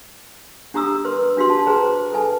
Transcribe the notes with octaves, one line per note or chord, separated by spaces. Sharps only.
D4 G4 A#5 D#6 E6
A#4 B4 C6
D4 F#4 G4 C6
A5
G#4 B4 C5 G5 A#5 C6
A4 B4 G#5 A5